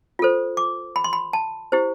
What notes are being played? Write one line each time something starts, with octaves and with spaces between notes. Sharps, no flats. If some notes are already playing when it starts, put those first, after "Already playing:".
F4 A4 C5
D6
B5
C6
B5
A5
E4 G4 C5